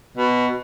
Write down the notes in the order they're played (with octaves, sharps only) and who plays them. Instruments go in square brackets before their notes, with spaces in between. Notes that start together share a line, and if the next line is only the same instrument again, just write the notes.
[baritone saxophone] B2